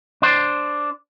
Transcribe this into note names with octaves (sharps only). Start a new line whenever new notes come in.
D4 C5